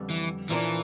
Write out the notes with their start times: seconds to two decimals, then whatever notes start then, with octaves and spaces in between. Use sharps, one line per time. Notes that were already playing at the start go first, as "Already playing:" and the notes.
Already playing: F2 D3 G3 B3
0.10 E3
0.49 A#2 E3 F3 A#3 D4